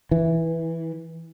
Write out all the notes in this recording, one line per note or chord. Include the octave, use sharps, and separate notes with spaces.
E3